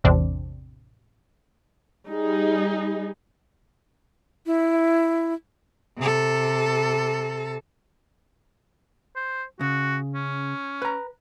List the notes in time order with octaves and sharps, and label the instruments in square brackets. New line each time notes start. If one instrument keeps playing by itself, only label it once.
[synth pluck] A1 E2 C3 C4 D4
[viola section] G3 D#4 G#4
[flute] E4
[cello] C3 A4
[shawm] C5
[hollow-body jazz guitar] C#3 [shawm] F#4
[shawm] C#4
[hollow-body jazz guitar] B4 A#5